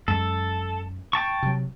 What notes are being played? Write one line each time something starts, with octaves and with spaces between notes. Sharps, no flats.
F#2 G#3 A4
G5 A5 C#6
C3 F#3